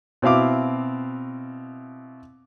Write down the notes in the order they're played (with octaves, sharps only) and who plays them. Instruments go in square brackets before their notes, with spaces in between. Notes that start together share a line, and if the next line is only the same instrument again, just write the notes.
[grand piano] B2 C4 E4 F5 D6